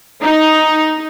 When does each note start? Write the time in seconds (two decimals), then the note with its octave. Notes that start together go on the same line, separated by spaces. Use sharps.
0.22 D#4